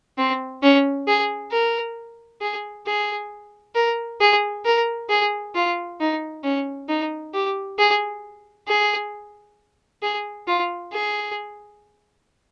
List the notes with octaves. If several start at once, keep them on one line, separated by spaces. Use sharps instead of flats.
C4
C#4
G#4
A#4
G#4
G#4
A#4
G#4
A#4
G#4
F4
D#4
C#4
D#4
G4
G#4
G#4
G#4
F4
G#4